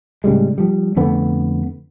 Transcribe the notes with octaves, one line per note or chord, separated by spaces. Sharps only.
A2 C#3 G3 G#3
F3 G3
F2 D3 A3 B3